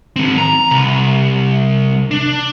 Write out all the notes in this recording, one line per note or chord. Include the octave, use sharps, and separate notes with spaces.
D#3 C4
A#5
C2
D4